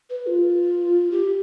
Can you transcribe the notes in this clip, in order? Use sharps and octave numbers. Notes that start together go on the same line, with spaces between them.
B4
F4
G4